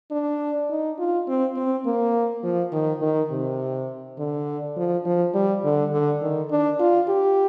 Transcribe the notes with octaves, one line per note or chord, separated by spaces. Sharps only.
D4
D#4
F4
C4
C4
A#3
F3
D#3
D#3
C3
D3
F3
F3
G3
D3
D3
D#3
D4
F4
G4